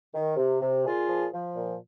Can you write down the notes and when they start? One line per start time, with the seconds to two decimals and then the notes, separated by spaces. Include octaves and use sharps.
0.14 D#3
0.37 C3
0.60 C3
0.84 A#2 F4 G#4
1.08 F3
1.32 F3
1.56 A#2